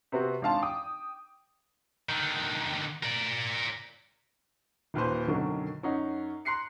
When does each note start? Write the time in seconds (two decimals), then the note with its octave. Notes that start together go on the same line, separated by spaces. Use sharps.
0.12 C3 B3 C4 F#4
0.42 G#1 D4 F5 A5 C6
0.63 G5 D6 D#6
2.09 D3 D#3
3.03 A#4 D5
4.94 D#1 D#2 B4 C5
5.28 F#2 B2 D3 D#3 F#3
5.83 F#2 C#4 D#4 F#5
6.45 A#5 C6 F#6 C7 C#7